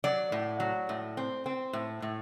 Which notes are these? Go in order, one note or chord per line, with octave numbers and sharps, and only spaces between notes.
F#3 D5
A2
F#3
A2
C4
C4
A2
A2